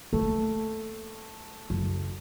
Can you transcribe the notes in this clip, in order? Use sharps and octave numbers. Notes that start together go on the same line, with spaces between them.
A3 A#3
F#1